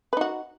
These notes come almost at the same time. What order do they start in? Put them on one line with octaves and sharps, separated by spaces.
B4 D#4 F#4